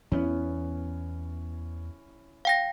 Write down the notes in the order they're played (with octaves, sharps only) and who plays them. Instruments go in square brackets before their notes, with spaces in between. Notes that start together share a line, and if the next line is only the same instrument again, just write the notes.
[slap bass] E2 B3 [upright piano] C#4 E4
[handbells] F5 G5 A#6